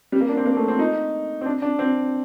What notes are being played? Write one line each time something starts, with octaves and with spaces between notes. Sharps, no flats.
G3
A#3
D4
C4
A#3
A3
C4
D#4
C4
D4
D4
C4